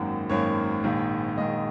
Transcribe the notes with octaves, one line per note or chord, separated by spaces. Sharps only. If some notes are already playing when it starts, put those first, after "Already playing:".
Already playing: G#1 F#2 D#3 A#3 F#5
G#1 F#2 D#3 A#3 C#5
A#1 G#2 D#3
A#1 G#2 D#3 D#5